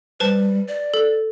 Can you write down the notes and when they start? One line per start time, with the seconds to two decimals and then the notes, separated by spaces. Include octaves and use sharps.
0.20 G3 B4 C5 A5
0.68 D5
0.94 A4